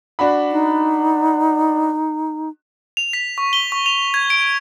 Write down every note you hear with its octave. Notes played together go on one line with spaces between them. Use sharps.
D4 F#4 B5
D#4
F7
B6
C#6
G7
C#6
F7
G#6
D7